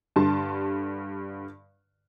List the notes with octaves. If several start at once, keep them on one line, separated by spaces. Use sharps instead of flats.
G2 D3 G3 A5 C6